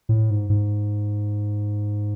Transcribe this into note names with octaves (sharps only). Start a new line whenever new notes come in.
A2
G#2
G#2